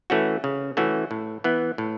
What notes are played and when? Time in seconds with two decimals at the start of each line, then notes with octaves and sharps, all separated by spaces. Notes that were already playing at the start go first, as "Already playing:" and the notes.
0.10 E3 A3 C#4 F#4
0.44 C#3
0.77 E3 A3 C#4 F#4
1.11 A2
1.44 E3 B3
1.78 A2